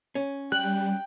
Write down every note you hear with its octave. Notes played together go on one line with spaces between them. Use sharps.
C#4
G3 G5 F#6